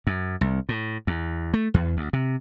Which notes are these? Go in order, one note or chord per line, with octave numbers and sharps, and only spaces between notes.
F#2
C2
A2
E2
A3
E2
D2
C3